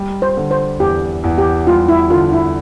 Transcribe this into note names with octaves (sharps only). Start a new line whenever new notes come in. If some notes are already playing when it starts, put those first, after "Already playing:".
Already playing: G3
C5
D3
C5
E2 G4
E2
G4
G3 F4
E4
D3 F4
E4